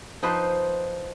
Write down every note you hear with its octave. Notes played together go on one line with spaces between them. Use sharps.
F3 D#4 B4 C5